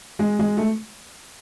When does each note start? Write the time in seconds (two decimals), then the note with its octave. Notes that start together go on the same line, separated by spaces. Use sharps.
0.19 G#3
0.39 G#3
0.57 A3